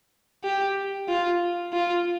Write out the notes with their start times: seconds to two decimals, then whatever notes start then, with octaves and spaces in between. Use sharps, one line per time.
0.44 G4
1.08 F4
1.73 F4